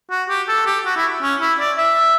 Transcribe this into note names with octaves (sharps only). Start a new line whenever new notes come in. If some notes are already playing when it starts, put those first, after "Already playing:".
F#4
G4
A4
G4
F#4
E4
C#4
E4
D5
E5